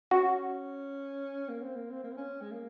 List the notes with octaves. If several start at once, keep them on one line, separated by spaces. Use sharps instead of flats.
C#4 F#4
A#3
C4
A#3
C4
A#3
C4
C#4
G#3
A#3